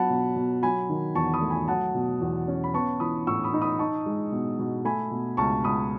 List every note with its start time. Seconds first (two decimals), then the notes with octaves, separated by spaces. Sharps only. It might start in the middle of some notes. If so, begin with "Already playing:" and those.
Already playing: F#3 B3 F#5 A5 B5
0.10 B2
0.36 B2
0.63 F#3 G#5 B5
0.90 D#3
1.15 E2 A5 C#6
1.33 B5 D#6
1.41 A3
1.50 G#5 B5
1.68 F#3 F#5 A5
1.95 B2
2.21 E2
2.48 C#4
2.64 B5
2.74 B3 A5 C#6
3.00 E3 B5 D#6
3.27 A2 C#6 E6
3.44 B5 D#6
3.54 D#4
3.62 B5 D#6
3.79 D#4 A5 C#6
4.06 G#3
4.32 B2
4.59 B2
4.85 A3 G#5 B5
5.11 B2
5.37 C#2 A5 C#6
5.64 C#2 B5 D#6